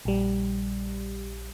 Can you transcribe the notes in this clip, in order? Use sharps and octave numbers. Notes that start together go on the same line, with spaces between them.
A#1 G3